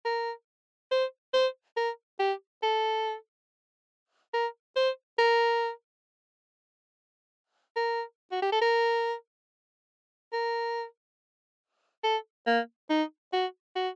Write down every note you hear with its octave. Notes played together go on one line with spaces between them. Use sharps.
A#4
C5
C5
A#4
G4
A4
A#4
C5
A#4
A#4
F#4
G4
A4
A#4
A#4
A4
A#3
D#4
F#4
F#4